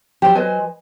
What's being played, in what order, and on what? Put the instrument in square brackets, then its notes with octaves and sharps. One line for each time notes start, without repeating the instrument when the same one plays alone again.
[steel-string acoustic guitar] F#3 C5 [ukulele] G4
[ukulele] B4 D#5 G#5